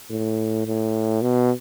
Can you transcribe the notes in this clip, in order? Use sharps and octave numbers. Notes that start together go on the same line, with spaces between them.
A2
A2
B2